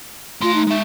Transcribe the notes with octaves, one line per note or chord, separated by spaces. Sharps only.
A3 F4 C6
D#4
G#3 E5